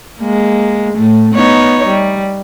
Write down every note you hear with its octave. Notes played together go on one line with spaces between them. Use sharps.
G#3 A#3
A2 A3
B3 D#4 C#5
G3